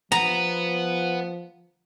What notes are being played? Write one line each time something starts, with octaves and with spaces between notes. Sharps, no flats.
F3 B3 A#5